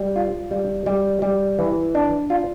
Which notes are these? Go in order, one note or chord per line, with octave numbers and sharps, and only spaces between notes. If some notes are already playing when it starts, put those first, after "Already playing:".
Already playing: G3
F4
G3
G3
G3
E3
D4
F4